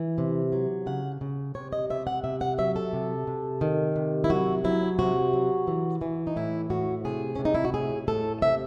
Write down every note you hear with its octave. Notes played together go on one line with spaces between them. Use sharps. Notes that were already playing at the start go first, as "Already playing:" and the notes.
Already playing: E3
C3
F#3
C#3 F#5
C#3
C3 C#5
D#5
C3 E5
F#5
C3 E5
F#5
F#3 E5
A4
C3
C3
D#3
C3
E4
F#3 F#4
F#3 E4
C3 F#4
F#3
E3
E3
D#4
A2 E4
A2 F#4
C3 G#4
C3 C#4
D#4
E4
F#4
A2 G#4
A2 A4
C3 E5